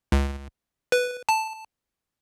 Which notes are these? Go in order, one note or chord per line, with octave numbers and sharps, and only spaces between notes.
C#2
B4
A5